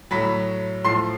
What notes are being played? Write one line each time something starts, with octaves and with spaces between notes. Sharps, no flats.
A2 F#3 B5 B6
A2 F3 C6 C7